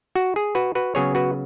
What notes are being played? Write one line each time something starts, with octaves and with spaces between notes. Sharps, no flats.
F#4
G#4
F#4 B4
F#4 B4
C#3 F#3 B3 G#4 C#5
F#4 B4